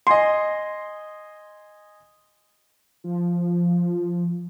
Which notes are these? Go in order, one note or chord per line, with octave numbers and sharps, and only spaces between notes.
D#5 G#5 C6
F3